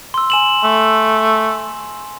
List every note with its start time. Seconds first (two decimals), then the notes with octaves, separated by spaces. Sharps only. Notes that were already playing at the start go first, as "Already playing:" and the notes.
0.14 C6 E6
0.30 G#5 E7 F#7
0.63 A3